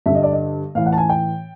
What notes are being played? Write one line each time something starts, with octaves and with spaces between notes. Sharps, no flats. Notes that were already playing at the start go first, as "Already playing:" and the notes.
G2 D3 E5
D#5
D5
D#5
A2 E3 F5
F#5
A5
G#5
G5